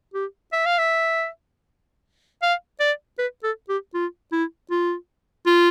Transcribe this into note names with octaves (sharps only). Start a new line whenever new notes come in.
G4
E5
F5
E5
F5
D5
B4
A4
G4
F4
E4
F4
F4